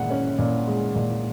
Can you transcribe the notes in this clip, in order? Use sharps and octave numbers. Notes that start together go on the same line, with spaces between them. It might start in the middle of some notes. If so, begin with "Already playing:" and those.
Already playing: A#2 G#3 F#5
C#4
A#2
G#3
A#2